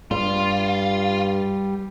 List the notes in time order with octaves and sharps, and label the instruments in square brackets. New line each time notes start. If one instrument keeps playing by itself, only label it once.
[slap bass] G2 [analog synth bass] G3 [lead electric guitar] F4